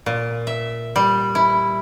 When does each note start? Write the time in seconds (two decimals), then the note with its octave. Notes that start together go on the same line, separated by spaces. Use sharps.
0.06 A#2
0.47 E5
0.96 G3
1.35 E4